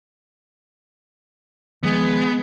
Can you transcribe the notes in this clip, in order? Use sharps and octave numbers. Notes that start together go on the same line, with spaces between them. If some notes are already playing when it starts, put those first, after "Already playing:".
D#3 F3 G#3 B3